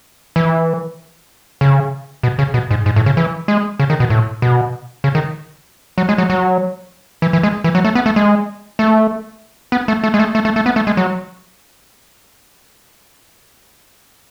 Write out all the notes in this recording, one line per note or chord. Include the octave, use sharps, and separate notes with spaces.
E3
C#3
B2
C#3
B2
G#2
G#2
A2
C#3
E3
G#3
C#3
D#3
B2
A2
B2
C#3
D#3
F#3
G#3
F#3
F#3
E3
E3
G#3
E3
F#3
A3
B3
A3
G#3
A3
B3
A3
A3
G#3
A3
A3
A3
A3
B3
A3
G#3
F#3